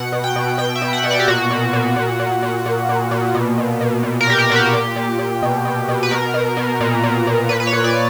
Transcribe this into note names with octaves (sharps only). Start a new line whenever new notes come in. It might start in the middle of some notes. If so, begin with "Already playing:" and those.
Already playing: B2 F#5
B2
G5
B2
B2 G5
E5
B2
F#5
B2
D5
G4
A#2 F#4
A#2
A#2
A#2
A#2
A#2
A#2
A#2
A#2
B2
B2
B2
A#2
A#4
A#2 G4
A#4
A#2 F#4
G4
A#2
A#2
A#2
B2
B2
B2
B4
B2 A#4
B2
B2
A#2
A#2
A#2
A#2 B4
B4
C#5
A#2
D5